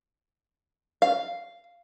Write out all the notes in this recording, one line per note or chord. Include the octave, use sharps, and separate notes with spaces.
F5